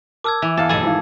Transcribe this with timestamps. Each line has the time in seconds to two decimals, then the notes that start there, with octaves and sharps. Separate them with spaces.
0.24 A#4 A5 D6 E6 F6 G#6
0.42 E3 E5
0.57 E2 A4 F5
0.69 F1 B1 G#4 A4
0.83 G#1 D#4 E4 F5